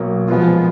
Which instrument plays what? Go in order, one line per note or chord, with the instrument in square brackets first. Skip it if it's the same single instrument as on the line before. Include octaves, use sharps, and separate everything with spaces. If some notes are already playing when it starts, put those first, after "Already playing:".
Already playing: [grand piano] B1 B2 A#3
[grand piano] A#2 G#3 B3 F4 [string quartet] F3